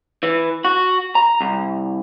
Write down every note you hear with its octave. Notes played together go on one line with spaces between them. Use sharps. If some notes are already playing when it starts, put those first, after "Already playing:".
E3
F#4
A#5
C2